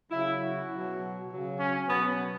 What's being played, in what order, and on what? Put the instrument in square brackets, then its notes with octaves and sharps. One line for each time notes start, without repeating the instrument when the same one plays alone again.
[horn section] C#3 F#3 E4
F#4
B2 F#3
C#3 F#3
C#4
B2 F#3 B3